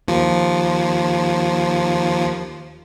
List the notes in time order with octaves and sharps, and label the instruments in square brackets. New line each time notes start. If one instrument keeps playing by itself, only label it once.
[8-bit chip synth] D#2 F3